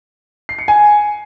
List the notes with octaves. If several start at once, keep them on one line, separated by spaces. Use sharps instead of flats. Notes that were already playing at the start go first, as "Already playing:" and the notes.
C7
C#7
G#5